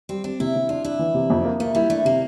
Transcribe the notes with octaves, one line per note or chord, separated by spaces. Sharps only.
G3 C4
C4 D4
C3 E4
C3
D4 F4
D4 E4
E3
C3
F2
A#3
A3 A#3
G3 E4
A3 D4
C3 A#3